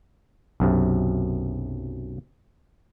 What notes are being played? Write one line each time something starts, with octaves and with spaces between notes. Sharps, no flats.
B1 F#2 C3